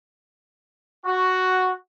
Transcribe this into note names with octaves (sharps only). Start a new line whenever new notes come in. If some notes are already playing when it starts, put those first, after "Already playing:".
F#4